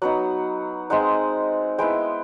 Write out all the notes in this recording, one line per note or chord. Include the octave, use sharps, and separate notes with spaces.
F#3 B3 D#4 F#5
G#3 C4 D#4 F#5
G#3 B3 E4 G5